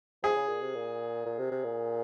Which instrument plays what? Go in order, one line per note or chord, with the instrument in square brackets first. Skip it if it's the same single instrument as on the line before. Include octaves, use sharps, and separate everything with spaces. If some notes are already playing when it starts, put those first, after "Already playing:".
[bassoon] F3 [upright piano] G#4
[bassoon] C#3
A#2
C3
A#2
A#2
C3
C3
A#2